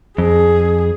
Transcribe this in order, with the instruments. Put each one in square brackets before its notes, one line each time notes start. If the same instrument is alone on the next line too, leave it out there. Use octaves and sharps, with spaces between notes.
[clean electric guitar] F2 [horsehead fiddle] G#4